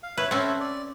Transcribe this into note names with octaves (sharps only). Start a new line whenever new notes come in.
F5
B4 C#5 E5
C4 C#4 A4 E5
D5